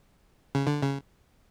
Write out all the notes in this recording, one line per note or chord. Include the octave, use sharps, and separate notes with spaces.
C#3
D3
C#3